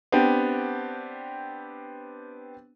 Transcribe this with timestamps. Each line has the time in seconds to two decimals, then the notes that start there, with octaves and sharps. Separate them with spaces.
0.12 B3 C4 D4 G4